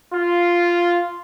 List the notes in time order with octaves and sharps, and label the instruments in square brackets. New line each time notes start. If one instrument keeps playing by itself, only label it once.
[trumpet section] F4